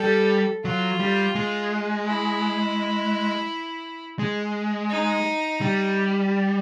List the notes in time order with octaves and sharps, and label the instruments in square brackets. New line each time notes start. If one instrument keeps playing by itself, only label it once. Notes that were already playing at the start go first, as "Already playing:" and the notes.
Already playing: [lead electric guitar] G3 [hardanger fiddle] A4
[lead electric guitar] F#3 [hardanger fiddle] F4
[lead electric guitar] G3
G#3
[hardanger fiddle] E4
[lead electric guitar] G#3
[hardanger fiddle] D#4
[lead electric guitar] G3